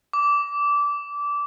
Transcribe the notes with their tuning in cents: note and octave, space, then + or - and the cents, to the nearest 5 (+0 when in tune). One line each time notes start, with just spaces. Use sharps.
D6 -20